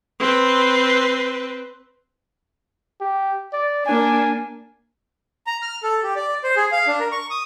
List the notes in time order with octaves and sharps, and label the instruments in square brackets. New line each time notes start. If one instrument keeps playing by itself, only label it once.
[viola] C4 B4
[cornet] G4
D5
[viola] A#3 D4 [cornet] G#5
[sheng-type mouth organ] A#5
F6
A4
G4
D5
C5
G#4
F5
D4
A#4
C#6
D#6